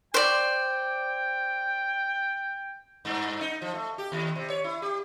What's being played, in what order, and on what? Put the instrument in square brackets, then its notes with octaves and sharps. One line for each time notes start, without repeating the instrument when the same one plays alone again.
[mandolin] C5 D5 [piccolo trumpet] G5
[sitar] G2
D#4
F3
A3
G4
D#2
C3
C#5
E4
G4